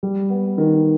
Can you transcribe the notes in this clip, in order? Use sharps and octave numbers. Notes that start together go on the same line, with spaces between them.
G3
B3
D#3